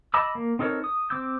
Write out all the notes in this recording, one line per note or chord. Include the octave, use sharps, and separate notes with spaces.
D#5 A5 B5 D6 E6
A#3
C4 D#4 A4 A#4 C#5
D#6
C4 D6 E6 G6